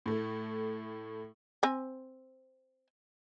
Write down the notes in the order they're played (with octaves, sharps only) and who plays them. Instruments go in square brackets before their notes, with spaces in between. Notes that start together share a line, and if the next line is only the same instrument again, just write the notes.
[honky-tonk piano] A2 A3
[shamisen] C4 G#5